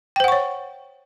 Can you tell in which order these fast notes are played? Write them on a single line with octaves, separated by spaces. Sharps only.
G5 C5 F#5 C#6 C#5